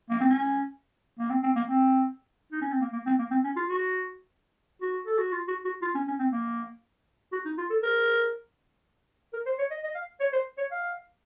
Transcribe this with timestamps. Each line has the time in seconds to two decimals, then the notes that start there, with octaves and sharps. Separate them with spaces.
0.10 A#3
0.21 C4
0.30 C#4
1.19 A#3
1.30 C4
1.43 C4
1.56 A#3
1.67 C4
2.52 D#4
2.61 C#4
2.72 C4
2.81 A#3
2.93 A#3
3.06 C4
3.19 A#3
3.31 C4
3.44 C#4
3.56 F4
3.69 F#4
4.82 F#4
5.06 A4
5.18 F#4
5.32 F4
5.48 F#4
5.65 F#4
5.82 F4
5.95 C#4
6.07 C#4
6.19 C4
6.32 A#3
7.32 F#4
7.45 D#4
7.58 F4
7.70 A4
7.83 A#4
9.33 A#4
9.46 C5
9.59 C#5
9.70 D#5
9.84 D#5
9.95 F5
10.20 C#5
10.33 C5
10.58 C#5
10.71 F5